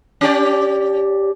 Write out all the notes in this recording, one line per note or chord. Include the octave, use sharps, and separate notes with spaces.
C#4 G4 D5